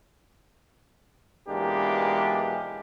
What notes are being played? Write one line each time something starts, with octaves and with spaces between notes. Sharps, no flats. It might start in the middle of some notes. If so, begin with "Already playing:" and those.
B1 E3 G#3 A#3 D4 G4